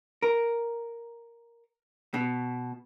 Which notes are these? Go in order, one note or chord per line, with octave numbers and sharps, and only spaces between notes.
A#4
B2